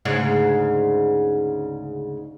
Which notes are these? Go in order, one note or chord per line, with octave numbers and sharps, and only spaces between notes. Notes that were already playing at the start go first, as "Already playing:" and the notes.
D2 G#2 C#3